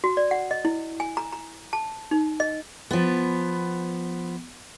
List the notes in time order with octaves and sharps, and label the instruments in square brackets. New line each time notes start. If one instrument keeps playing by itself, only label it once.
[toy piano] F#4
D5
F#5
D#5
E4
G#5
A#5
A#5
A5
D#4
D#5
[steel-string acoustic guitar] F3 B3